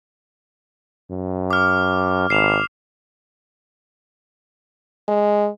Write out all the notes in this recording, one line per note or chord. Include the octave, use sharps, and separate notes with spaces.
F#2
D6 F6
G#1 C7 E7 F7
G#3